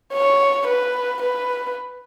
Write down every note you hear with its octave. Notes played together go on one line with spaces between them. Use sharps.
C#5
B4
B4